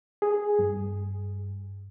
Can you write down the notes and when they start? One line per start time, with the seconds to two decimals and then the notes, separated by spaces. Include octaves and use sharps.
0.22 G#4
0.59 G2